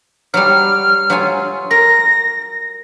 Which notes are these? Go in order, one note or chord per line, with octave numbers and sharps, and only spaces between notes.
F#3 G3 F6
F#3 F4 G#5
A#4 A#6